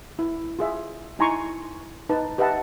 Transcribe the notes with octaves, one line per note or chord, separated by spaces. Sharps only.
E4
F4 G#4 E5
D#4 E4 G#5 A#5 C6 C#6
D#4 B4 A5
G4 B4 D#5 E5 F#5 A5